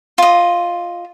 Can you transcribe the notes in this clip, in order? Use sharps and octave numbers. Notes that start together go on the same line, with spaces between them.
F4 D#5